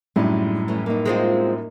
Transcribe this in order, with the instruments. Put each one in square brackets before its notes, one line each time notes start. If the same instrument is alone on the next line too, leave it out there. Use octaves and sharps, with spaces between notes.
[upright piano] F#2 A2 G3 [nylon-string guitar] G#3 D4 D#4
[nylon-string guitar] E3 A3 C#4
A#3 D#4
[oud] G#3 C4 F4